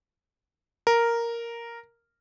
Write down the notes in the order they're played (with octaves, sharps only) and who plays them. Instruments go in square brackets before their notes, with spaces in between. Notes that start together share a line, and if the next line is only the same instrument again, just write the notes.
[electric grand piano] A#4